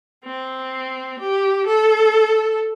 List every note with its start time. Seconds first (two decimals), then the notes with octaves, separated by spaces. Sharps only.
0.24 C4
1.20 G4
1.67 A4